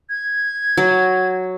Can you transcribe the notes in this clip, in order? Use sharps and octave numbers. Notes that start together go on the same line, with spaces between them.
G#6
F#3